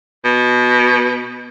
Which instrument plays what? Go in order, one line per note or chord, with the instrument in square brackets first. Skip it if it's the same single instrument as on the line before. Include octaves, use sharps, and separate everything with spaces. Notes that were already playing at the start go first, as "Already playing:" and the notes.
[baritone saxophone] B2